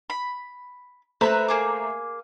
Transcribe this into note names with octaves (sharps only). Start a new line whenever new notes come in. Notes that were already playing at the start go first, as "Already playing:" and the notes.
B5
A3 B4 C5 E5 A#5 F#6
A#3 G#4 D6